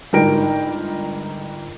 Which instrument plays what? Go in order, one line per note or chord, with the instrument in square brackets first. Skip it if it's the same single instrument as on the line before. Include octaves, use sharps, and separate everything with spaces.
[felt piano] G1 G#2 D#4 A#4 G5 D7